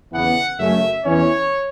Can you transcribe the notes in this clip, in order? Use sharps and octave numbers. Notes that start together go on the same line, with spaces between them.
E2 C#3 E3 B3 F#5
F#2 C#3 A3 C#4 E5
E2 E3 C#4 C#5